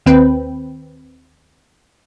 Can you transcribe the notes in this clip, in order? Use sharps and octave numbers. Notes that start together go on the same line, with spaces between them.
D#2 C4 B4 G5